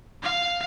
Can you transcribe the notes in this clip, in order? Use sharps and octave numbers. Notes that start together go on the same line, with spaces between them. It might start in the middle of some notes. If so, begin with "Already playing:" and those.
F5